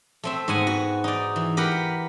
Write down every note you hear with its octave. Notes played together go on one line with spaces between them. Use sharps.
A3 C4 E5
G#2 B3 F#5 G#5
F#4
D#4 D5
E3
G4 A#4 B4 F#5